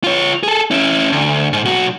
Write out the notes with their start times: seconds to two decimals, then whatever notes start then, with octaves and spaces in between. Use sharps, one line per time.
0.04 F4 C#5
0.43 G#4 A4
0.71 C#4 E4
1.12 D2
1.53 G#2
1.65 B1 F#4